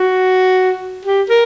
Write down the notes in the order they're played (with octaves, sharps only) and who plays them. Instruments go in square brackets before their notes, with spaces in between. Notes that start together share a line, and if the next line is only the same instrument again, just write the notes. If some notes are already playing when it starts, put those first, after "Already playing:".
Already playing: [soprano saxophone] F#4
G4
A#4